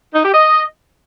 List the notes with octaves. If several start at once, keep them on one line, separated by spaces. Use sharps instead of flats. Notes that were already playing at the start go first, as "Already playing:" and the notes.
D#4
G4
D#5